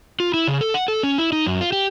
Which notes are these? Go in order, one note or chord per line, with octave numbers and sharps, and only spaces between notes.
F4
E4
C#3
A4
F#5
A4
C#4
E4
D#4
F#2
F4
G4